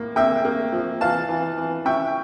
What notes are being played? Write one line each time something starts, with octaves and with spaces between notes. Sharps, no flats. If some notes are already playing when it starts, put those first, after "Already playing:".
Already playing: A2 A#3
A#3 E5 G5
A#3
F3
E3 F5 A5
E3
E3
C#4 E5 G5